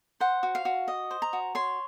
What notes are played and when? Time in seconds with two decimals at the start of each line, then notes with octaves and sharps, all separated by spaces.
0.20 C5 F#5
0.43 F#4
0.55 F5
0.65 F#4
0.88 D#5
1.11 C5
1.22 A#5
1.33 F#4
1.55 C#5 C6